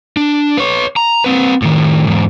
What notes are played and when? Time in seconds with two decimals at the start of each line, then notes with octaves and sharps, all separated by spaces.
0.17 D4
0.57 B4 C#5
0.96 A#5
1.24 C4 B4
1.62 A2 D#3
2.07 E2 G#2